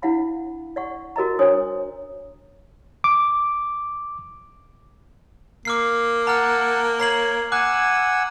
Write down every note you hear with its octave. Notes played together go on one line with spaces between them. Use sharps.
D4 E4 F5 F#5 B5
D5 F#5 C#6
F#4 A#4 D#5 A#5
D4 C5 C#5 G#5 D#6
D6
A#3 D6 F6 C7
F#5 A5 A#5 F6
C#5 A#5 C7 F#7
F#5 G#5 D6 E6 F#6